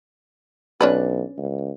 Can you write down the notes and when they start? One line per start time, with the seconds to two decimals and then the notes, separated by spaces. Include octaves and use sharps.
0.81 B1 C#4 D4 B4
1.38 C#2